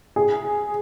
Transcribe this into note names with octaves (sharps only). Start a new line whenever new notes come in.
G#4